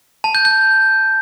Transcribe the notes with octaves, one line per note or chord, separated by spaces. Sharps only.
A5
G6
G6